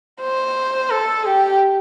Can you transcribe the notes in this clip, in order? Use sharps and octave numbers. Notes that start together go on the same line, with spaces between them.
C5
A4
G4